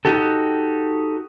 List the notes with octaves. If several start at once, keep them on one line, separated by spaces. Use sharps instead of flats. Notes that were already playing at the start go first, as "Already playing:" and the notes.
D#4 F#4 G4 A4